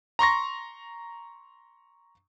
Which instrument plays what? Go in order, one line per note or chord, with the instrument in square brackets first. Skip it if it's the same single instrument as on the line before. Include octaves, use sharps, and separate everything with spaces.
[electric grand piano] A#5 C6 C#6 A#6